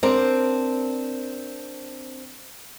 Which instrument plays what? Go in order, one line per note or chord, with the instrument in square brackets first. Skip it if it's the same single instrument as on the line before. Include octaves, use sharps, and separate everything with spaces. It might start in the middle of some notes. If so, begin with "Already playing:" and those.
[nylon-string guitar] C4 D4 A#4 C5